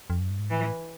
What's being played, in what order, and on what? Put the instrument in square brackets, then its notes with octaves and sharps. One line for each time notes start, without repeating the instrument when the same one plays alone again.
[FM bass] F2
F#2
G2
G#2
[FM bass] A2 [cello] E3